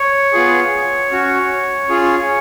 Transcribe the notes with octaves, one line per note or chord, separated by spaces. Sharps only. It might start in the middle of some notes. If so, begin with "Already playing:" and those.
Already playing: C#5
B3 F4 G#4
C#4 F#4
C#4 F4 G#4